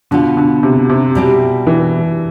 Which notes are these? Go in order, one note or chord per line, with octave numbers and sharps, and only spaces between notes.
B2 D3 B3 F4
D3
C3
C3
B2 G3 C4 E4
E3